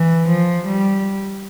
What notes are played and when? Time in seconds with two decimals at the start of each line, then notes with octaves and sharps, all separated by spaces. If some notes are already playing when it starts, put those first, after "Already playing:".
Already playing: E3
0.28 F3
0.66 G3